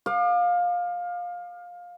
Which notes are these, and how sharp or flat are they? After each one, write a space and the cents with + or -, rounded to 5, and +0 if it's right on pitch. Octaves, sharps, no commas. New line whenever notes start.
F5 +20 D6 +40